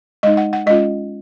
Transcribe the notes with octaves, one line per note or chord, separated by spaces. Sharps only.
G#3 D#4 D#5
F#5
F#5
G#3 C#4 F4 D#5